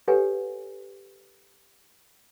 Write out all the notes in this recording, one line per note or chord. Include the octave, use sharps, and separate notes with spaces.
G4 A4 B4 C#5 F#5 G#5